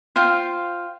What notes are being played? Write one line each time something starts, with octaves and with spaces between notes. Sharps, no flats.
F4 C5 F5 G5